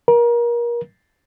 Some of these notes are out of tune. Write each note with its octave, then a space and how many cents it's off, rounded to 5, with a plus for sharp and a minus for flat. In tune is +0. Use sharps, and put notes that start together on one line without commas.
A#4 +30